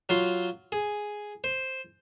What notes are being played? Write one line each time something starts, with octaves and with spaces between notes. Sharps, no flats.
F#3 F4 C6
G#4
C5